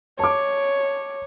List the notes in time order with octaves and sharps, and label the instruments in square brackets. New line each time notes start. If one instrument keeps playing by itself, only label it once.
[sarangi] C#5 [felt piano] A5 D6